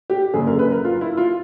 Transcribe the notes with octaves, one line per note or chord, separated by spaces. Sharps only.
G4
F#1 F#2 D3 G#4
A#4
B4
A#4
F4
E4
F4